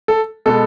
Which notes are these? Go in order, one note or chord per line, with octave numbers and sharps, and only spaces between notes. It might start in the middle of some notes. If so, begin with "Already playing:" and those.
A4
B2 G#3 B3 A4